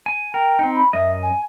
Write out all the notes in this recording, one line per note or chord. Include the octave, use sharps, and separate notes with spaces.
G#5
A#4 G5
C4 D#4
B5
F#2 D#5 E5
G#5